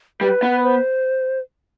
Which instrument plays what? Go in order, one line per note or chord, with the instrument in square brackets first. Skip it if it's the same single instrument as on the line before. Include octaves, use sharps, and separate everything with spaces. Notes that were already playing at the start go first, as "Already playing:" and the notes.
[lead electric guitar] G3 [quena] B4
[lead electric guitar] B3
[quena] C5